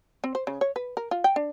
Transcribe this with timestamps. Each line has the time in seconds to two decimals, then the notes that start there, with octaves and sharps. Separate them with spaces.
0.24 C4
0.35 C5
0.47 C#3
0.61 C#5
0.76 B4
0.97 A#4
1.11 F4
1.24 G5
1.36 D4